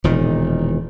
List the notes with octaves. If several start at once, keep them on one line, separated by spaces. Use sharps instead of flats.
E1 A#2 D#3